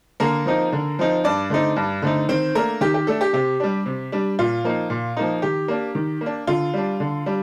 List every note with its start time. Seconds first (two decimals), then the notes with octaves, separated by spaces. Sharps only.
0.20 D3 A#3 A#4
0.46 F3 C4 D#4
0.72 D3
0.99 F3 C4 D#4
1.24 G2 D4 D5
1.50 D3 A3 C4 D#4
1.76 G2
2.02 D3 A3 C4 D#4
2.29 D#3 C4 C5
2.55 A3 A#3 D4 A#4
2.81 D#3 G4
2.94 G4
3.07 A3 D4 A4
3.21 G4
3.33 C3 G4
3.60 G3 D4
3.86 C3
4.12 G3 D4
4.39 A#2 F4
4.64 F3 A#3 D#4
4.90 A#2
5.17 F3 A#3 D#4
5.42 D#3 G4
5.68 A#3 D4
5.95 D#3
6.21 A#3
6.26 D4
6.47 D3 F4
6.74 G3 D4
7.00 D3
7.26 G3 D4